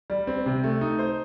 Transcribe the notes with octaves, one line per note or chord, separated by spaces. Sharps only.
G3
C4
C3
A3
D#4
C5